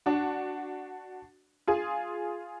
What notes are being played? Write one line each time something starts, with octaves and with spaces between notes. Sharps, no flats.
D4 F#4
F4 G#4